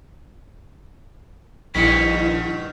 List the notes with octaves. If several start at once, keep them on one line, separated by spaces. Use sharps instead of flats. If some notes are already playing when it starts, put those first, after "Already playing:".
A#1 G2 B2 D#3 E4 B6 C#7